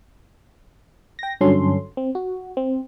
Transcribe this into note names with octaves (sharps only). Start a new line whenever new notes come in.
G5 A#6
G2 D3 F#3 C#4 A4 C6
C4
F#4
C4